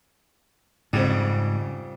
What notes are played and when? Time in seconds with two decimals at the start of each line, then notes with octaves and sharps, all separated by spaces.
0.93 F2 G#2 C#3 G3